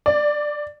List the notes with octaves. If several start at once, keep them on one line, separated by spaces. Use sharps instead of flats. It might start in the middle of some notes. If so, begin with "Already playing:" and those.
D5